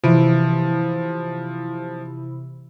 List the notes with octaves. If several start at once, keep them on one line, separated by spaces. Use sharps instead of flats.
C3 E3 F3 E4 D7 D#7